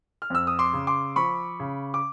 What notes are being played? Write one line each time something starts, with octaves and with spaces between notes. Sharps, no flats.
F6
F2 E6
D#6
C6 D6
C#3
C6 D6
F3 B5 C#6
C#3
D6